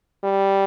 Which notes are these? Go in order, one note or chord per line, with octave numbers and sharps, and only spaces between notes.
G3